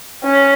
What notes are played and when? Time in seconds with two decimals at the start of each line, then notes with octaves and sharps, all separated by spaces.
0.24 C#4